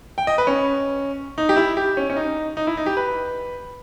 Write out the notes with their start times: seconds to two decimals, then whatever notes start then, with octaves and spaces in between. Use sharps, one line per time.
0.18 G5
0.27 D#5
0.38 B4
0.47 C#4
1.38 D#4
1.49 G4
1.56 E4
1.77 G4
1.97 C#4
2.10 C#4
2.16 D#4
2.57 D#4
2.67 E4
2.77 D#4
2.86 G4
2.97 B4